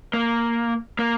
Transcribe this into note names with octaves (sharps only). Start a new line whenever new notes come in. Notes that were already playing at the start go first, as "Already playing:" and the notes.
A#3
A#3